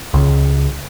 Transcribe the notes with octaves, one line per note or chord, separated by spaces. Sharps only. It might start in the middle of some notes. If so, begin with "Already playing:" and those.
C#2